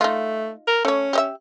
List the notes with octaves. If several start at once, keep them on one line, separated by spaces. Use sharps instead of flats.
A3 D#4 F4
A#4
A3 C#4 C#5
G4 D#5 E5